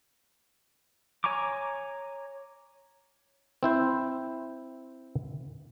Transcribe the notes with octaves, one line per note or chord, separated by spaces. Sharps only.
C#5 G#5 A#5 C#6 D6
C4 E4 C5